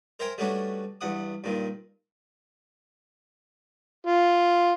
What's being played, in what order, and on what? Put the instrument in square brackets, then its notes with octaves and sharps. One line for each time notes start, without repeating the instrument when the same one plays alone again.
[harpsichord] A#4 C5 E5 G5 G#5 A#5
G3 A3 B3 C#4 D4 F#4
E2 G2 F#5 D#6
G2 A#2 D#3
[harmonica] F4